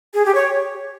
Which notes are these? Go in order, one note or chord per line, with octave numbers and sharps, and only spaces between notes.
G#4
G4
C#5